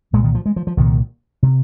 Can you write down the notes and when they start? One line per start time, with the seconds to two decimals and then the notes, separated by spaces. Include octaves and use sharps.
0.13 C2 A#2 G#3
0.24 D#3
0.35 F3
0.46 G#3
0.56 F3
0.67 F3
0.77 C2 A#2 D#3
1.43 C3